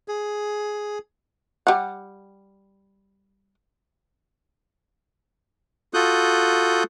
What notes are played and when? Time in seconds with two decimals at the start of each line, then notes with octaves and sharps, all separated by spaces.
0.08 G#4
1.67 G3 F#5
5.94 F4 F#4 A4 D#6 F#6 G6